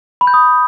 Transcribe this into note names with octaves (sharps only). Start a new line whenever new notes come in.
B5
G6
D#6